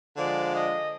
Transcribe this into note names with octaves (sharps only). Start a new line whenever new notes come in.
D3 F3 G#3 D5
D#5